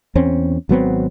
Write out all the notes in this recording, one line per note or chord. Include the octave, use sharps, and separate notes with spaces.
E2 C4 C#4
G#1 F#3 B3 C4